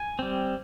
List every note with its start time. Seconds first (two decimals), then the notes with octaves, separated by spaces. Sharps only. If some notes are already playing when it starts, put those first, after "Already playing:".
Already playing: G#5
0.19 G3 C4